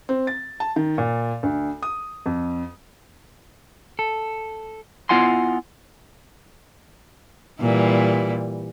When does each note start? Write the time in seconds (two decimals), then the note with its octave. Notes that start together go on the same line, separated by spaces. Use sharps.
0.09 C4
0.27 A6
0.60 A5
0.76 D#3
0.98 A#2
1.43 D2
1.82 D#6
2.26 F2
3.99 A4
5.09 B3 E4 F4 F#5 G#5 C6
7.60 A#2 E3 G3